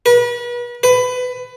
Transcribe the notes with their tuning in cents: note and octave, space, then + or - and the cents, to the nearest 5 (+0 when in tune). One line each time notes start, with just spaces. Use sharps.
B4 -40
B4 +20